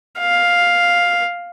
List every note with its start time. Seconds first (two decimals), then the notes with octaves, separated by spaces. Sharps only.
0.19 F5